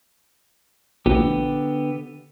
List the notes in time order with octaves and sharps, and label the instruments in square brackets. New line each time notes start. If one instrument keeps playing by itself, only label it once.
[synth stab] A#1 [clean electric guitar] D3 B3 G4